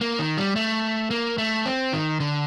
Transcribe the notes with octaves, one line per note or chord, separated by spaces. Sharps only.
A#3
D#3
G3
A3
A#3
A3
C4
D#3
D3